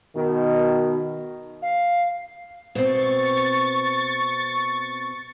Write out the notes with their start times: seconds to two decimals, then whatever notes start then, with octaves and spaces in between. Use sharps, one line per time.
0.15 B2 D#3
1.62 F5
2.75 B2 C4 C#6 A6